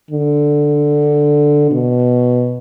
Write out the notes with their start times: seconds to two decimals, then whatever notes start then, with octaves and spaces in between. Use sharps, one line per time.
0.11 D3
1.71 B2